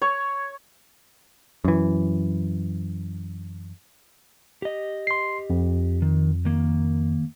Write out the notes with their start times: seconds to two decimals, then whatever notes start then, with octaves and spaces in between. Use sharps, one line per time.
0.02 C#5
1.64 F#2 E3
4.62 G4 D#5
5.07 C6 C7
5.50 F2
6.02 D#3
6.45 D#3 A#3